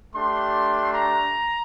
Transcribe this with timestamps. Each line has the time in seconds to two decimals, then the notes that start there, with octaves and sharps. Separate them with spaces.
0.13 A3 D4 G4 C6
0.94 A#5